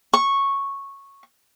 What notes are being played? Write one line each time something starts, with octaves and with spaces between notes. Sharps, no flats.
C#6